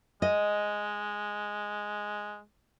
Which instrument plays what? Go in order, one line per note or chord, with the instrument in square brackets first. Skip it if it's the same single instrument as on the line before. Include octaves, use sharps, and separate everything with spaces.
[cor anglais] G#3 [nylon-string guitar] D#5